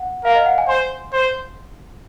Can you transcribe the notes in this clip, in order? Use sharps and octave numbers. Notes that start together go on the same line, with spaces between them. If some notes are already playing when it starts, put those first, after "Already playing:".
Already playing: F#5
A#4 F5
D#5
F#5
G#5
C5 C6
C5